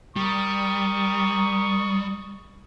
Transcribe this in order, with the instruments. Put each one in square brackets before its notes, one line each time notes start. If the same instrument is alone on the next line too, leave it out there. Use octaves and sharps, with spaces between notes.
[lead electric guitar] G3 [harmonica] A#4 C#6 D#6